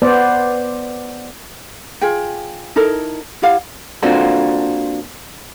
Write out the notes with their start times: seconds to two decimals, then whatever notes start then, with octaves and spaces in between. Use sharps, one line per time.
0.02 B3 C5 D5
2.01 F4 G#4 G5
2.76 D#4 E4 A4 A#4
3.42 E4 G4 F5 F#5
4.03 A#3 C4 D4 F4 F#4 A4